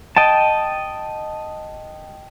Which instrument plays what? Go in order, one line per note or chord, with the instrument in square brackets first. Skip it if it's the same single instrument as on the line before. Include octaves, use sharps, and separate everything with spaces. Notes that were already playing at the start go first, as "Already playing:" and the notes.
[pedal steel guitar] D#5 G5 A5